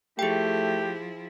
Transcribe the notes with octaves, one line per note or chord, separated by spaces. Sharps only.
F3 A3 E4 G4 G#4 G5